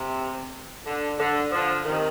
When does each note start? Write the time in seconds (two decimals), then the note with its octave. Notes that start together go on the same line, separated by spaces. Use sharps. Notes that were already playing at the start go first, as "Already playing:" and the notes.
Already playing: C3
0.85 D3
1.18 D3
1.52 D3 F3
1.85 C3 D#3